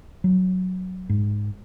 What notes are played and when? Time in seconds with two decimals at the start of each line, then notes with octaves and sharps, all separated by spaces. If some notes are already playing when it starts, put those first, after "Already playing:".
0.24 F#3
1.09 G#2